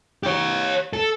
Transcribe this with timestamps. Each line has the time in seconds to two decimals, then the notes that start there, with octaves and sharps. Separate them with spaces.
0.23 G4 C#5
0.93 A4